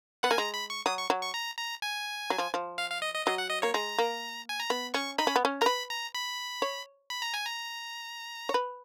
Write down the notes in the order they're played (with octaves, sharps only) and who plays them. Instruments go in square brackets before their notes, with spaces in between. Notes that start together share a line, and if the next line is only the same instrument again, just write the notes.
[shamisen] B3 [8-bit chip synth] F#5
[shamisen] A#3 [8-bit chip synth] G#5
[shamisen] G#3 [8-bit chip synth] A#5
[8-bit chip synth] B5
C#6
[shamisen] F#3 [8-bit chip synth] D#6
[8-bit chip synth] C#6
[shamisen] F#3
[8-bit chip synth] C#6
A#5
A#5
G#5
[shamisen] F#3
F3
F3
[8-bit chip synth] F5
F5
D#5
D#5
[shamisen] F#3 [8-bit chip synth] D#5
[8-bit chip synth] F#5
D#5
[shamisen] A#3 [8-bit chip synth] C#5
[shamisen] G#3 [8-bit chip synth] A#5
[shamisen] A#3
[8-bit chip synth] G#5
A#5
[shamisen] B3 [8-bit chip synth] B5
[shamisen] C#4 [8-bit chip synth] C#6
[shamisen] D#4 [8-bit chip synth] B5
[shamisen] C#4
B3
C#4
[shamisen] A#4 [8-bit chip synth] A#5
[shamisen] B4 [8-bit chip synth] B5
[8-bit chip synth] A#5
B5
[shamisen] C#5
[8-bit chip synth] B5
A#5
G#5
A#5
[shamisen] C#5
B4